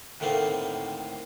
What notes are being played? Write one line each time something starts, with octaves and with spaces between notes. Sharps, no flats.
A2 D3 D#3 A3 A#3 C4